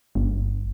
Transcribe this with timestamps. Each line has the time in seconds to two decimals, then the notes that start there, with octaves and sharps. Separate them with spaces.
0.15 G1